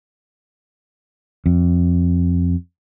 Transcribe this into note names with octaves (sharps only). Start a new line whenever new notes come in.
F2